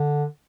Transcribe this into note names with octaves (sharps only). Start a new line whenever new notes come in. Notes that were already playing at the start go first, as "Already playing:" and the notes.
Already playing: D3